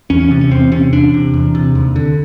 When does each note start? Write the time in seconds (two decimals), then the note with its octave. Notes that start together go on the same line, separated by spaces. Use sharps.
0.10 E2 C#4
0.21 C#4
0.31 C3
0.41 C#4
0.51 E2 C4
0.72 C3 C#4
0.93 E2 D4
1.14 C3
1.34 E2
1.55 C3
1.75 D#2
1.96 D3